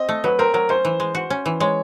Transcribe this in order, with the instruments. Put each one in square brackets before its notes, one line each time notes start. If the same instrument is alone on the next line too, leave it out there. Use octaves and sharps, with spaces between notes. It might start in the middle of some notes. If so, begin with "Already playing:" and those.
Already playing: [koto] C4 [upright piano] D#5
[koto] A3
[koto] F#3 [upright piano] B4
[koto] C4 [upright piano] A#4
[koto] F#3 [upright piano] A#4
[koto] C#4 [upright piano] C5
[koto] E3
G#3
F#4
C#4
E3
[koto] G#3 [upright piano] C#5